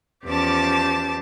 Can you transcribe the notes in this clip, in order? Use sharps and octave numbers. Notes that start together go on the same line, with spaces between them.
E2 F3 C#4 G4 A5 D6